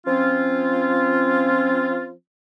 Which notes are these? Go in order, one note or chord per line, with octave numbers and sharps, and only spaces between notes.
F3 C4 C#4 F4